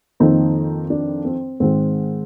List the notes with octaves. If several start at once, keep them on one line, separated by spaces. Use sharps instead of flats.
F2 D#3 A#3 C4 D#4
D4
C4
G#2 D#3 G#3 C4